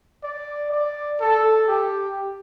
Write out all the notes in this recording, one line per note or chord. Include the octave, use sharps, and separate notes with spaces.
D5
D5
A4
G4